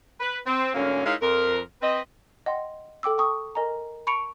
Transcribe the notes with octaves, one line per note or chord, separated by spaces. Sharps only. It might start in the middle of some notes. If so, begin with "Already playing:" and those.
B4
C4
D2 G#2 D3 A#3 C#4
G#3 D#4 E4 A#4 C#5 F5
F2 A#4
C4 B4 D#5
D#5 F#5 G5 C6
A4 G5 D6 E6
G5 A5 C#6 D#6
A#4 D#5 G#5 A#5
A5 B5 C#6 C#7 D7 F7